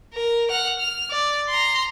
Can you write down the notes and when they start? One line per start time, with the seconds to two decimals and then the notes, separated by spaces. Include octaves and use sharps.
0.13 A#4
0.50 F#5 F6
0.79 F6
1.11 D5
1.49 A#5 C6